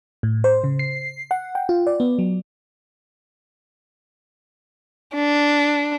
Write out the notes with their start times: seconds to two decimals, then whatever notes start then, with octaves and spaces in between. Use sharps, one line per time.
0.23 A2
0.44 C5
0.64 C#3
0.79 C7
1.31 F#5
1.55 G5
1.69 F4
1.87 D5
2.00 B3
2.19 F#3
5.15 D4